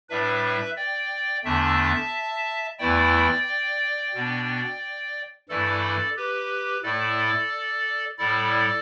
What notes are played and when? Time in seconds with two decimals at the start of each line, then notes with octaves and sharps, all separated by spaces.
0.09 A2 G3 D4 B4 E5
0.77 D5 G5
1.44 E2 D3 A3 D4 E5 A5
2.79 E2 E3 A3 E4 D5 G5
4.14 B2 B3 D4
5.49 G2 E3 A3 E4 A4 D5
6.16 G4 B4
6.83 A2 A3 E4 A4 D5
8.18 A2 G3 E4 A4 D5